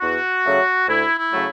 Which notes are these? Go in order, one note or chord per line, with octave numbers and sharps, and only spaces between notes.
E2 F#4
C#3 F#3 A3
D2 E4
E4
C#3 F#3 A3